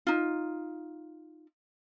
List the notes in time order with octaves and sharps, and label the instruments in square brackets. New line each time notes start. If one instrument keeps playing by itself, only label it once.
[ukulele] D#4 F4